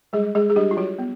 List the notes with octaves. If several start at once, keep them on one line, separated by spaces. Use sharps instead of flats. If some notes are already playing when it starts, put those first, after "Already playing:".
G3 G#3 G#4
G#3 G#4
G#4
G3 D4 G4
F4
F#3 F#4
B3